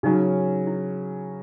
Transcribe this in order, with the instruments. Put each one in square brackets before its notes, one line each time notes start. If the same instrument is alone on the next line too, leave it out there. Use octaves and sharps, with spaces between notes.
[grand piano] C#3 F#3 C#4 [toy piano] D#4
[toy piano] E4